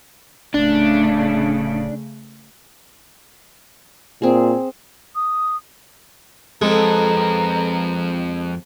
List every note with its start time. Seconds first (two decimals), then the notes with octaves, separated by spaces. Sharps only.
0.54 D1 C#3 A3 D4
4.22 A#2 C4 G#4
5.15 D#6
6.62 F2 G#3 C4 A4 B4 A#5